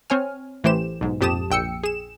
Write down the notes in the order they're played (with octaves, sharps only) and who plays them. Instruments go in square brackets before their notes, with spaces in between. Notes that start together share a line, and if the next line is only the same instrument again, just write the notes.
[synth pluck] C4 C#5 G#5 F6
A1 E3 A3 G4 C5 E7
B1 G#2
A#1 F2 G4 A5 D#6 E7
A#1 G5 E6 C#7
G#4 E7